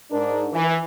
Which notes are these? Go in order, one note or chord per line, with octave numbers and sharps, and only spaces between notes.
G#2 D4 A#4
E3